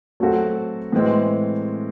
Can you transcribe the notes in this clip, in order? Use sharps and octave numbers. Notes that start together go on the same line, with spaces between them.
F#3 A3 C4 F#4 A4
A2 E3 G#3 C4